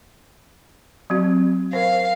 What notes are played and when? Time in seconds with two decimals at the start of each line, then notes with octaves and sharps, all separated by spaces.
1.10 F#3 C4 F#4
1.73 A#4 C5 F5